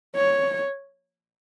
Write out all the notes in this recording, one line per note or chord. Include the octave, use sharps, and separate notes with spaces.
C#5